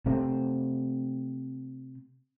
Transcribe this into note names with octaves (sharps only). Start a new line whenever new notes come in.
C3 A3 C4